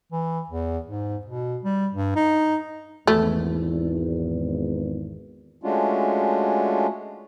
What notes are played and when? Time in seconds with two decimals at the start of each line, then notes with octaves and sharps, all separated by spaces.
0.12 E3
0.50 E2
0.86 G#2
1.26 B2
1.64 G3
1.93 G2
2.16 D#4
3.07 G#1 E2 A3
5.63 G#3 A3 C#4 D4 F4 F#4